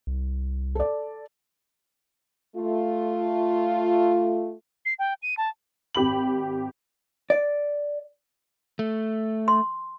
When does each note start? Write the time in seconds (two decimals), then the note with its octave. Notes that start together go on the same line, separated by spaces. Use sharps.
0.07 C2
0.75 A4 D5
2.56 A3 F4
4.85 C7
4.99 G5
5.22 D#7
5.37 A5
5.95 G#1 G4 B5 F#7
7.30 D5
8.79 A3
9.48 C6